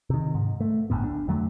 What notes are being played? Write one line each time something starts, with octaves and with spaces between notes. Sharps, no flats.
C3 D#3
G#2
A3
G1 D2 A2 B3
D4
F2 D3 F#3 A3